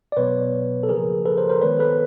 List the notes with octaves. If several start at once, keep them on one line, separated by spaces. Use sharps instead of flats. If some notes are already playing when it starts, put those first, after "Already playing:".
D5
B2 F#3 B3 B4 C#5
A4
C#3 F3 A#3 G#4 A#4
A4 B4
A#4 C5
A#4 C5
D#3 G#3 B3 B4 C#5
A4 B4